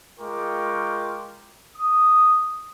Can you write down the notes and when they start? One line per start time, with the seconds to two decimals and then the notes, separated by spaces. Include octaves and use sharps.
0.20 G#3 F4 A#4 G5 C#6 D6
1.77 D#6